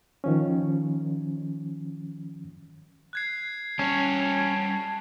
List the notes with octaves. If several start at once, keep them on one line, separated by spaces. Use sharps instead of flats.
D#3 F3 C#4
F#6 G#6 C7
G3 C#4 C#5 A5